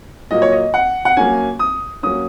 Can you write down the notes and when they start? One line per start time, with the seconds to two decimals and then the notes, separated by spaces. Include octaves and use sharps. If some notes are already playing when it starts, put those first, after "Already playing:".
0.31 A#2 F#3 A#3 D#5
0.42 C#5
0.52 D#5
0.74 F#5
1.05 F#5
1.17 F#3 A#3 C#4 G#5
1.59 D#6
2.03 F#3 A#3 C#4 D#6